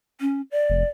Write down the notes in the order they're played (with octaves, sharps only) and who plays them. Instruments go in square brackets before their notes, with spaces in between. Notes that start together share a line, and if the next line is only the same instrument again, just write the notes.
[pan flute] C#4
D5
[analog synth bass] F1